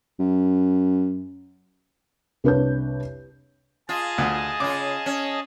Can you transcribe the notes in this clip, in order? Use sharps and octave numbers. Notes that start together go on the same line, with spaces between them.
F#2
C2 D4 B4 C#5 G6
F4 G#4 D#5 A5
D2
C#3 F4 D6
C#4